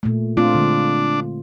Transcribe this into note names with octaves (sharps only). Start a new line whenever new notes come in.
A#2 A3
A3 C4 D4 F4
D3 G#3